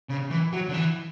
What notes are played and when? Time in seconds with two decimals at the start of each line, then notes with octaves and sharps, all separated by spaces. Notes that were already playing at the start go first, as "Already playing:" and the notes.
0.09 C#3
0.31 E3
0.53 F#3
0.69 D3
0.74 E3